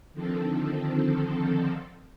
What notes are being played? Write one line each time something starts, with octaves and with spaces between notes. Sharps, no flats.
D3 D#3 F3 C4 A4